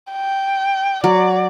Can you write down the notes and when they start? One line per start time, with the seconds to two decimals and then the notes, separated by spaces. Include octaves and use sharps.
0.12 G5
1.04 F#3 D5